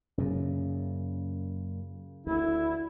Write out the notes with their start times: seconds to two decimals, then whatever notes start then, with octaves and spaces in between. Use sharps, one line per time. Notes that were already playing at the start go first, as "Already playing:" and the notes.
0.18 F#2 A#2 C#3
2.27 D2 D3 E4